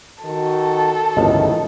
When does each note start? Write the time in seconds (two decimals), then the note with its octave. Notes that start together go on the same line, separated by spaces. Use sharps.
0.24 D#3 F#4 A4
1.17 G1 C#2 A2 D#3 E3 D#5